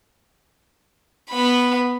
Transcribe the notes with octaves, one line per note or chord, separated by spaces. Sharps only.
B3 B5